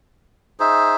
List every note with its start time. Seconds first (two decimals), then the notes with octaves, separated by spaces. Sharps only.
0.60 D#4 G#4 C5 E5